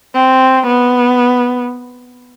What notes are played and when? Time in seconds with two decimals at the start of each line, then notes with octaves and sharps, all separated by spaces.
0.14 C4
0.67 B3